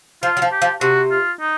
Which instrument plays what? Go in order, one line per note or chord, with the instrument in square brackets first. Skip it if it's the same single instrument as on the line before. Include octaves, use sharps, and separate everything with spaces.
[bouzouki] F3 [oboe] F4
[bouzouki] F#3
F3
[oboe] G4
[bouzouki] F3
[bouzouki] C3 [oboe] F#4
[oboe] F4
D#4